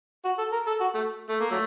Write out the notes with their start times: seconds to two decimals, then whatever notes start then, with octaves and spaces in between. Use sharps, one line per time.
0.25 F#4
0.38 A4
0.52 A#4
0.67 A4
0.81 F#4
0.95 A3
1.29 A3
1.40 A#3
1.51 F#3 A3